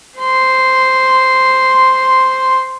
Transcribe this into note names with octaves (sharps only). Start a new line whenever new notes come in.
C5 C6